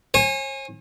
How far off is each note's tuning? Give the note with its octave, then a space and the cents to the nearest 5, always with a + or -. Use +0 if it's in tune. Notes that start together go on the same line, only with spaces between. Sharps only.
C#5 -45 G#5 -10